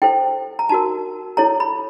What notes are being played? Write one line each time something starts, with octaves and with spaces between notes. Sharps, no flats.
E4 A4 C5 G5
A#5
D#4 F#4 A#4 A5
E4 A4 C#5 A#5
B5